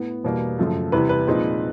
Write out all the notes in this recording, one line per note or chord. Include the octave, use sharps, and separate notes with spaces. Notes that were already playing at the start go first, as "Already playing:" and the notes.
Already playing: A2 B3
E2 B2 G3 A#3
F#2 C#3 F3 A3
E2 C3 E3 G3 B4
B4
A#2 F3 G#3 C4 D#4